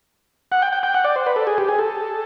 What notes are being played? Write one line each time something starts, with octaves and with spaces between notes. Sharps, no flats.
F#5
G5
G5
G5
F#5
D5
C5
B4
A4
G#4
G4
G#4
A4